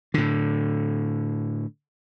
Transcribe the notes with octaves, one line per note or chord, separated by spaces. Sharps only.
A2 D3